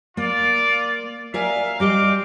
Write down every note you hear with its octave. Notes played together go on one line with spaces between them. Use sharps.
A#3 F4 D5
A#4 D5 E5 F5 G#5
G3 C4 G4 D#5 F5 D6